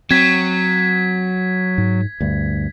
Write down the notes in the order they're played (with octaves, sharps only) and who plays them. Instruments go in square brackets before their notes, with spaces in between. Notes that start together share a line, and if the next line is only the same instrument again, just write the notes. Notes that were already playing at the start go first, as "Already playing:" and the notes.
[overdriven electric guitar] F#3 [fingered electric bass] C4 [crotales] G#6 B6
[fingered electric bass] G#2
D2 G2